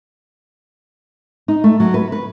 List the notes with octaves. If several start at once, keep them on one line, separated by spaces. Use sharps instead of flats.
D#4
A3
F#3
B4
B4